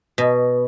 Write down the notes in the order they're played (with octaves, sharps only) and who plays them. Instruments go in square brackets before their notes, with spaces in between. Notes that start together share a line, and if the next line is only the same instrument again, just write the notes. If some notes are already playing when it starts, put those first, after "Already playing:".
[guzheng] B2